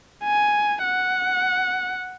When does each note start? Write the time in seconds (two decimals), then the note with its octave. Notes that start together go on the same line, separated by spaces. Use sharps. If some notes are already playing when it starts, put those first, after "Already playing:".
0.24 G#5
0.85 F#5